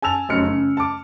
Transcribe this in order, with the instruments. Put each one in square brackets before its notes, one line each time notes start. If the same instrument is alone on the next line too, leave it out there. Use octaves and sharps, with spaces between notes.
[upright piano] G#5 A5 E6 F7
F1 F#2 F6 C#7
C#3
A5 D6